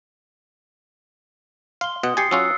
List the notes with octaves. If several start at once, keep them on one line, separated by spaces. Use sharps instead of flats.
F5 C6 G7
B2 F#5 D#6
G4 G#5 A6 C7 C#7
F#3 C#4 F4 E6 F#6